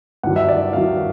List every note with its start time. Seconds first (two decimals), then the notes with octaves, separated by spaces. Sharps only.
0.23 G2 D#3 F#3 F#5
0.36 E5
0.48 D5
0.73 G2 D#3 F#3 F5